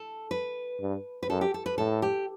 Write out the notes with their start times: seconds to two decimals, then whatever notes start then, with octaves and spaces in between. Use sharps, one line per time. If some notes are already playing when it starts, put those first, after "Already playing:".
Already playing: A4
0.31 B4
0.80 G2
1.23 B4
1.29 F#2 A4
1.41 G4
1.54 A4
1.66 B4
1.78 A2 A4
2.02 G4